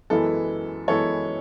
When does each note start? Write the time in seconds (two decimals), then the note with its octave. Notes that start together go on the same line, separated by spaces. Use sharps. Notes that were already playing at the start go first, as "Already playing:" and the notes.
0.10 F#2 E3 G#3 B3 E4 A4
0.88 F#2 E3 G#3 B3 E4 A4 C#5